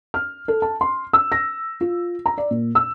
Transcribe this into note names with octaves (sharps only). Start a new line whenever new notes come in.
F6
A4
A5
C6
E6
A#6
F4
A#5
D5
A#2
E6